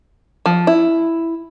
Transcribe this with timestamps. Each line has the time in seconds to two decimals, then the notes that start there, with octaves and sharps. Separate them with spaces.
0.46 F3
0.67 E4